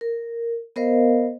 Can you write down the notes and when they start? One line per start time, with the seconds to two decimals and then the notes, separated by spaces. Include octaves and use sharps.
0.01 A#4
0.76 B3 A#4 C5 D#5 F5